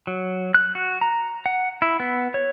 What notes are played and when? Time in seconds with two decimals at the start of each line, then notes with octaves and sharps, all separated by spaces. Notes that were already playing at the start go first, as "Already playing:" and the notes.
0.07 F#3
0.54 F#6
0.75 F#4
1.01 A#5
1.46 F#5
1.82 E4
2.00 B3
2.34 C#5